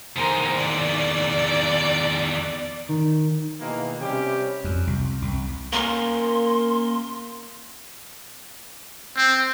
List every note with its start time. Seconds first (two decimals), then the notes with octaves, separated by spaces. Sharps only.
0.16 E2 D#3 A#4 C5 G#5
0.56 D5
2.89 D#3
3.60 B2 D#3 E3 G#3 A#3
4.01 C3 G3 C#4 G4
4.64 F2
4.87 C2
5.22 C2
5.73 A#3 C#4 A#4 C6
9.17 C4